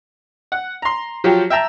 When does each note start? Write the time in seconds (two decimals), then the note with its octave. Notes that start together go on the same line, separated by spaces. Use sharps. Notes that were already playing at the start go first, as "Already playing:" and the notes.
0.52 F#5
0.82 A#5 C6
1.24 F3 F#3 F4 G4
1.50 E5 G5 A5 A#5 E6